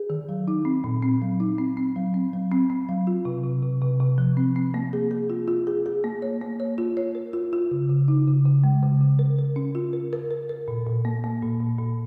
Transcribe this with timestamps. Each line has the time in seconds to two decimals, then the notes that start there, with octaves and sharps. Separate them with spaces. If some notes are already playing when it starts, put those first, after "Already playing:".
Already playing: G#4
0.10 D#3
0.29 F#3
0.48 D#4
0.65 C4
0.84 A#2
1.02 C4
1.22 F#3
1.40 D#4
1.58 C4
1.77 C4
1.96 F#3
2.14 C4
2.33 F#3
2.52 C4
2.70 C4
2.89 F#3
3.07 F4
3.25 C3
3.44 C3
3.63 C3
3.82 C3
4.00 C3
4.18 F3
4.37 C4
4.56 C4
4.74 A#3
4.93 G#4
5.11 G#4
5.30 F4
5.48 F4
5.67 G#4
5.86 G#4
6.04 A#3
6.22 C#5
6.41 A#3
6.60 C#5
6.78 F4
6.97 C#5
7.15 A#4
7.33 F4
7.53 F4
7.71 C#3
7.89 C#3
8.08 D#4
8.27 C#3
8.45 C#3
8.64 G#3
8.83 C#3
9.00 C#3
9.19 A#4
9.39 A#4
9.56 C#4
9.75 F4
9.93 A#4
10.13 A#4
10.31 A#4
10.49 A#4
10.68 A#2
10.86 A#2
11.05 A#3
11.24 A#3
11.43 A#2
11.61 A#2
11.79 A#2